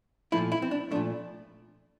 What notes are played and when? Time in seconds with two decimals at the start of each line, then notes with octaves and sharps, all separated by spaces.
0.32 A#2 F3 A3 E4
0.52 E4
0.62 C4
0.71 D4
0.91 A#2 F3 A3 D4